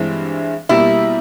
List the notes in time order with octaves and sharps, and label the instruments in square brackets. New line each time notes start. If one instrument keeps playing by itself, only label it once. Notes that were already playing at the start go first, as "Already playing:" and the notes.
Already playing: [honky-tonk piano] G2 E3 G#3 C4 E4
[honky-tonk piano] B2 G3 A#3 [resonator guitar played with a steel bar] E4